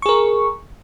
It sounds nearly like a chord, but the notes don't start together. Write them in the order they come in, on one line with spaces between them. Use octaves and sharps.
C#6 G#4 A#4